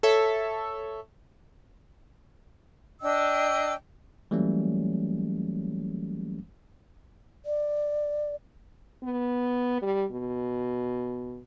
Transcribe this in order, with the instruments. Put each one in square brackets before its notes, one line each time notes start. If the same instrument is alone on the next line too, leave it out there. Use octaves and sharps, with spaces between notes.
[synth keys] A4 C#5 E5
[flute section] D4 D#5 G5 E6
[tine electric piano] E3 F#3 G3 A3 A#3 C#4
[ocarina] D5
[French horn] B3
G3
B2